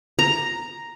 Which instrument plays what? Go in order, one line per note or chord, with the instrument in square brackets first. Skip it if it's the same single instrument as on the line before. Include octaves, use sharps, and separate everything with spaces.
[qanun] A#5